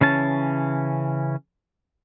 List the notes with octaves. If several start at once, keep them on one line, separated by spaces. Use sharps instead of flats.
C#3 E3 C#4 A5